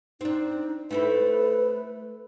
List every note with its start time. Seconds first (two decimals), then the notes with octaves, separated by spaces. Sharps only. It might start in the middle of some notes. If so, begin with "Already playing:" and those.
0.21 C4 D4 D#4
0.91 A3 C4 E4 B4